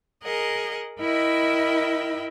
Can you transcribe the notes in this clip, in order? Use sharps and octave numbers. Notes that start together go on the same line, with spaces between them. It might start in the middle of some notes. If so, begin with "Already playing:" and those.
G#4 A#4 D#5 F#5
E4 A#4 D#5 E5 G5 B5